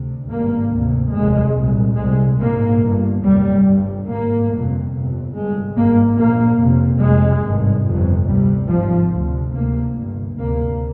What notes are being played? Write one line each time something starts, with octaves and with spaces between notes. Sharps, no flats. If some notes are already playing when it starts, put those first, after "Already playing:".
Already playing: D2 C3
G#1 G2 A#3
D2 C3
F1 D#2 G#3
C2 A#2
C2 C3 G#3
A#1 G#2 A#3
G1 G2
F1 D#2 G3
G1 G2
G#1 G#2 A#3
G1 F2 C3
G1 F2 C3
G1 G2 G#3
G#1 G2 A#3
A#1 A#2 A#3
F1 F2 C3
F1 F2 C3 G#3
G#1 G2
G1 F2 C3
D2 C3 G3
G#1 G#2 F3
D2 C3
D2 C3 A#3
G1 G2
D2 C3 A#3